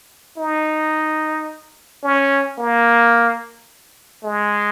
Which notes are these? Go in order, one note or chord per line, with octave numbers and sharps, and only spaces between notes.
D#4
C#4
A#3
G#3